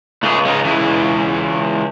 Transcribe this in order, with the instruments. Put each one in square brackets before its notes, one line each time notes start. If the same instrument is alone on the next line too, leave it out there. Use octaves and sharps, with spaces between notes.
[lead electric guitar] C#2 [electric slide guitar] A3 G#4
[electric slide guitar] G#3 C#4 D#4
E3 G#3 E4